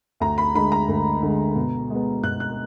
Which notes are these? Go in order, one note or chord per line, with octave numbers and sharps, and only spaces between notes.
D2 A#5
B5
D3 G#3 B5
A#5
D2
D3 G#3
B2
G#3 B3
B2 F#6
F#6